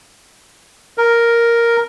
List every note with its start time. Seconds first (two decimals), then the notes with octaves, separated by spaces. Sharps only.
0.98 A#4